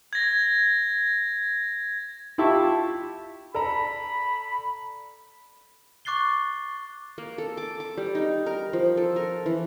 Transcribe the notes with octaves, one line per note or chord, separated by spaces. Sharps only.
G#6 A#6
E4 F4 G4 E5 A5 C#6
A4 D5 A#5 B5
C#6 D6 F#6 A6 C7 G7
A#3
A4
D6
D6
G3
D#4
A#4
F3
A4
A#4
E3